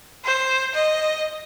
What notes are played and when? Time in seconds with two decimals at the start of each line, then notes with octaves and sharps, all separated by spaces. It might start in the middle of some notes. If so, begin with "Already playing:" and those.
0.25 C5
0.74 D#5